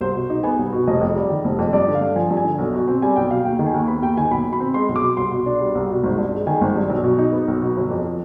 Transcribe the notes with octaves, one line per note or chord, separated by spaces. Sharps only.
C2 C5
B2
D#4
B3 G#5
C2
B2
F1 D#5
F2
G3
D#3
F1
F2
G2 D5
D3
F5
G2
F3 G#5
G2
G#5
D3
B1
B2
C4
G3 G#5
B1 G5
B2 F5
D#2 G5
D#3
G#5
D#2
B3 B5
D#2 G5
D#3 G#5
B1 B5
B2
B5
C4
G#3 C6
B1
D6
B2
C2 C6
B2
D4
G3
C2
B2
G#1
G2
G#3
D#3 G#5
G#1
G2
B1
B2
D#4
B3
B1
B2
G1
F2